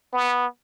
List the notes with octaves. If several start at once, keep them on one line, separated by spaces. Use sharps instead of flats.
B3